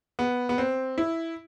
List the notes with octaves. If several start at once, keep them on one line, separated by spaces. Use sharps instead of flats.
B3
B3
C4
E4